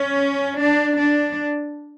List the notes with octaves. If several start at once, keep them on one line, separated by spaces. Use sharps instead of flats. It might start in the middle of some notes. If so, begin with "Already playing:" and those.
Already playing: C#4
D4
D4